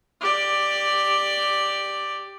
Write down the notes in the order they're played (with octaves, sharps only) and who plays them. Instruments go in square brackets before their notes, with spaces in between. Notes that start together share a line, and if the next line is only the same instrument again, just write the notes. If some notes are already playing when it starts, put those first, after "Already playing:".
[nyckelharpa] G4 D5